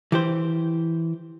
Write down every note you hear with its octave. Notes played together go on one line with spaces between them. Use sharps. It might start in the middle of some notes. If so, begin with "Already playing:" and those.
E3 G4 C5